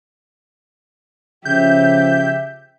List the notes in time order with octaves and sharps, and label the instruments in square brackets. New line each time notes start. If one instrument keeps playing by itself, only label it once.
[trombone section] C#3 F3 [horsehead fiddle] G4 E5 [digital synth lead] G6